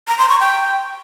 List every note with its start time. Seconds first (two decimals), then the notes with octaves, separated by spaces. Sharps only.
0.08 A#5
0.19 C6
0.29 C#6
0.40 G5